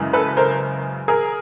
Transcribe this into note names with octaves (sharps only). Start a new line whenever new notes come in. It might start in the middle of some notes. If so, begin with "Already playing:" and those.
Already playing: F#2 C#3 E3 G#3
A4 B4
A#4 C5
G#4 A#4